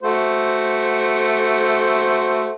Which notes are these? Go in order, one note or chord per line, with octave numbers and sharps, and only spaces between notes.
A3 F#4 C5